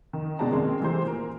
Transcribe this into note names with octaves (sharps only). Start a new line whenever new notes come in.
D#3
B2 G#3 D4 G5 A5 A#5
D#3 G#3 A#3 C4
E3 G#3 A3 E4 G4 C5
A#2 A#4